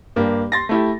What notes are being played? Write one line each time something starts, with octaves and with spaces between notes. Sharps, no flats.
G2 A#3 D4 G4
C6 A6 A#6
A3 E4 G4